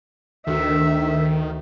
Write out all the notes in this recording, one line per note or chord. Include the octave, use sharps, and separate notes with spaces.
D2 D#3 F#4 E5